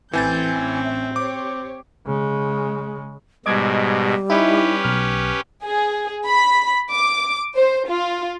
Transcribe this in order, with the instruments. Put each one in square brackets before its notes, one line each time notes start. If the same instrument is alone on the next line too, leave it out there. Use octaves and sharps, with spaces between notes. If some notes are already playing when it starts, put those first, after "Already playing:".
[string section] A1 G6 [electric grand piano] E3 G#5 A6 [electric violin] C4
[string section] A1 C#4 E5
[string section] G4 C5 C#5 [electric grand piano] D6
[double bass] C#3 G#3
[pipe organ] G#2 B2 [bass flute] G3 [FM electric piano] D#5 D6 G#6
[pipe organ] C#4 G4 B4 [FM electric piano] D#4 E4
[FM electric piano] B1 F6
[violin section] G#4
B5
D6
C5
F4